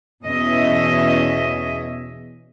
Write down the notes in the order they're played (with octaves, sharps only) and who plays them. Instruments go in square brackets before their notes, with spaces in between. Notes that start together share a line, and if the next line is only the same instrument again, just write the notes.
[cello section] E2 B2 C#4 D#5 E5